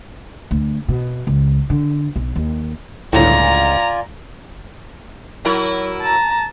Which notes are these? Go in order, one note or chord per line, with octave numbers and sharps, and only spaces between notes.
D2
B2
C#2
D3
B1
D#2
G1 C#2 A2 F4 D5 G#5 A#5
F#3 E4 A#4
A5 A#5